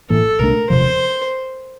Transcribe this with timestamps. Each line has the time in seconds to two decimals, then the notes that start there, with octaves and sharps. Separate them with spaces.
0.10 A1 A2 E3 A#3 A4
0.39 C2 A#2 A3 D4 A#4
0.70 E1 E2 C3 F3 C5